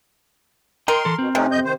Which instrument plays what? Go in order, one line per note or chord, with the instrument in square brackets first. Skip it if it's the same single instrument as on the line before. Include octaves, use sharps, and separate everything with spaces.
[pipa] A#4 [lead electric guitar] D#5 G5 [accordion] C6
[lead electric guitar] E3 A4
[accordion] B2 [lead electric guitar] C4
[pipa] C3 [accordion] A3 C#4 D#4
[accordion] F2 D#5 G6
D#3 C5